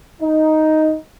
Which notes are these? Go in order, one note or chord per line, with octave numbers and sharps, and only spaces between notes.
D#4